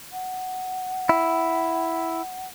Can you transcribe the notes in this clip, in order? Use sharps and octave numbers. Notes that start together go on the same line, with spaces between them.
F#5
E4